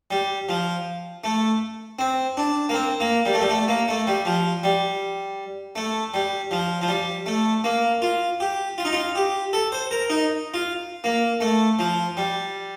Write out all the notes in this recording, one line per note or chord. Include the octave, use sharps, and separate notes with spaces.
G3
F3
A3
C4
D4
A#3
C4
A#3
G3
A3
G3
A3
A#3
A3
G3
F3
G3
A3
G3
F3
F3
G3
A3
A#3
F4
G4
F4
D#4
F4
G4
A4
C5
A#4
D#4
F4
A#3
A3
F3
G3